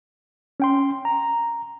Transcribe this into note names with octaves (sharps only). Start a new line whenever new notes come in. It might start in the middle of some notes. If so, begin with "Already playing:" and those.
C#4 G5 C6
A#5